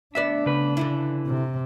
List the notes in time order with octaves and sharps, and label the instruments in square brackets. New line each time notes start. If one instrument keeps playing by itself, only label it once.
[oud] D2 B3 D5 [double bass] D4 [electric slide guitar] E5
[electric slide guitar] C#3 B4
[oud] D3 E3 E4
[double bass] C3